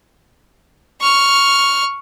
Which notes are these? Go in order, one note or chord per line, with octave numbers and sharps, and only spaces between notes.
C#6 F6